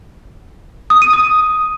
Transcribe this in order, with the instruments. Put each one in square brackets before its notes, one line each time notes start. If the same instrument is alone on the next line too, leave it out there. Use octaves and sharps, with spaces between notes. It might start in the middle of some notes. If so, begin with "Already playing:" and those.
[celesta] D#6
D#7
D#6